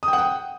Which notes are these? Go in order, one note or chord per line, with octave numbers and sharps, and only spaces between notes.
D#6
G5
F#5
G5